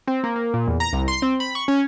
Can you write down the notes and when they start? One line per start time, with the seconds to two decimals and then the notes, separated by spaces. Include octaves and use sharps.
0.07 C4
0.24 A#3
0.36 A#3
0.54 A#2
0.67 E2
0.80 A#5
0.93 C2
1.08 C6
1.22 C4
1.40 B5
1.55 C#6
1.68 C#4